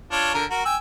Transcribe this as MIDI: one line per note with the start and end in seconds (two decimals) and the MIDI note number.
0.11 0.33 62
0.11 0.33 65
0.11 0.33 73
0.34 0.44 50
0.34 0.44 70
0.50 0.65 66
0.50 0.65 70
0.65 0.76 79
0.65 0.76 80
0.65 0.76 88